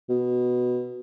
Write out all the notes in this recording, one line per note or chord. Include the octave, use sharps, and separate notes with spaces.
B2